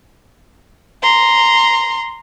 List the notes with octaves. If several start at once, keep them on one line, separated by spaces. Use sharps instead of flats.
A#5 C6